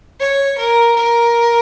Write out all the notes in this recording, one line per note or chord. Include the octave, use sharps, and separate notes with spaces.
C#5
A#4
A#4